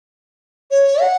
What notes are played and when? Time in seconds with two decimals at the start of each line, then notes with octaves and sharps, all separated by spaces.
0.71 C#5
1.02 F#5